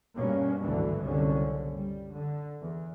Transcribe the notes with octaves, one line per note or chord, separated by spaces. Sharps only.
G2 B2 A#3 C#4
G#1 D2 B2 D3 E3
F#1 C2 D3 C#4
G3
D3
E2